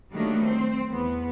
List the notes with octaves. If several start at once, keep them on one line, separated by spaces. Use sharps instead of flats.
D#3 F#3 G3 A3 A#3 D4
C4 C5
E2 B3